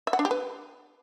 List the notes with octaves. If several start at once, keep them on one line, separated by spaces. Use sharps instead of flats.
E5
F#5
D4
G4
B4